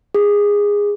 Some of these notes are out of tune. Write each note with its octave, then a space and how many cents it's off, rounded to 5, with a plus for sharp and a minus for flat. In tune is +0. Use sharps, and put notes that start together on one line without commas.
G#4 -15